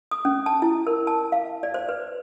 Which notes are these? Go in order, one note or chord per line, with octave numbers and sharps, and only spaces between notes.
D#6
C#4
A5
E4
A#4
A5
F5
D5
C5
B4